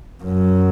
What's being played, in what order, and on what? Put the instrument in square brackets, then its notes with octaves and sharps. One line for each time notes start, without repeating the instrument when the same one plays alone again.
[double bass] F#2